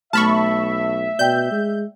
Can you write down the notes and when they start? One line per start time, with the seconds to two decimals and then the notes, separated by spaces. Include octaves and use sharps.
0.13 B1 A3 E5 A5 B5 C#6 F6
1.19 B2 D5 G5 G6
1.52 G#3